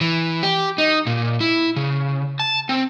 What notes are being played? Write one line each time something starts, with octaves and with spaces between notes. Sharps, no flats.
E3
G4
D#4
A#2
E4
C#3
A5
C4